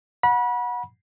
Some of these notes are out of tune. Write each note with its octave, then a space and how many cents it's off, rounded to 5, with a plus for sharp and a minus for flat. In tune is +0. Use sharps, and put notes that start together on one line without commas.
F#5 -20 B5 -30